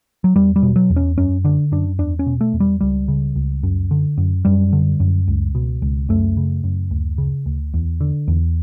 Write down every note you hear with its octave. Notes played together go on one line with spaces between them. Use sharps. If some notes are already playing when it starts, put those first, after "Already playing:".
F#3
E2 G3
G3
B2
F#3
E2
C#4
F#2 C#4
D3 D4
F#2 D4
E2 D4
C#4
B2
A3
E2
G3
C#2 G3
C#3
C#2
F#2
D3
F#2
F#2 G3
D3
F#2
C#2
B2
C#2
F#2 A3
C#3
F#2
D2
C#3
D2
E2
D3
E2